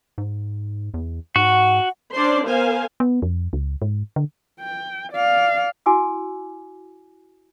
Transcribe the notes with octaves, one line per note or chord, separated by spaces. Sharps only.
G#2
E2
G#2 F#4 F#5
C#4 D4 C5 D5 C6
B3 A#4 C5 F5 G#5
B3
F2
C#2
G#2
D3
G5
D5 F5
E4 F#4 G#5 D6 E6